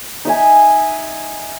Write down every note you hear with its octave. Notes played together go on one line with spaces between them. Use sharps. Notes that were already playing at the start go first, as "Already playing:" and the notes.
D#4 E5 G#5